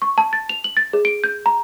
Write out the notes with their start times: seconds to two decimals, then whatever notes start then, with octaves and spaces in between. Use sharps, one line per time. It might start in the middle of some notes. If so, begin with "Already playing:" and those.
0.02 C#6
0.18 A5
0.33 A6
0.49 F7
0.64 F#7
0.77 A6
0.93 G#4
1.05 D7
1.24 G6
1.46 A#5